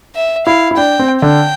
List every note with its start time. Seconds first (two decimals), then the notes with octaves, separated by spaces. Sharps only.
0.15 E5
0.46 E4 F5
0.71 E4
0.77 D4 G5
0.99 C4
1.22 D3 G5